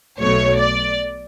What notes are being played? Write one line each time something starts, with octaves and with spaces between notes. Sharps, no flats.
B1 B2 A3 C#5
D5